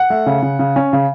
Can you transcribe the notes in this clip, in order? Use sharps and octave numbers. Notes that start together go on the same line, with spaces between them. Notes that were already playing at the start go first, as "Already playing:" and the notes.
Already playing: F#5
A3
C#3
C#3
C#3
C#4
C#3